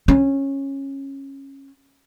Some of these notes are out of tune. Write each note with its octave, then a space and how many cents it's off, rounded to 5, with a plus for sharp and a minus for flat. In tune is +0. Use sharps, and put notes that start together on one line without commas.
C#4 -15